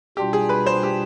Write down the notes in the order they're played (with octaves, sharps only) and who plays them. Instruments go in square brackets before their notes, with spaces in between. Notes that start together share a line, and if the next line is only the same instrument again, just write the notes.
[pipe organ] B2 G3 D4 F4 [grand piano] G4
[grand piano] G#4
B4
C5
G4